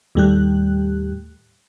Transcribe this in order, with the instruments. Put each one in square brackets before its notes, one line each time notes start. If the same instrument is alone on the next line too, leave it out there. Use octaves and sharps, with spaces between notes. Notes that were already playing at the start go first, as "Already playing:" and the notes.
[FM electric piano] D#2 A2 G3 A3 G4 F#6